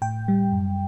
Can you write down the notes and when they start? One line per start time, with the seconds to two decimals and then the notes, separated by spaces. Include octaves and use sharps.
0.02 A2 G5
0.28 G3
0.52 F#2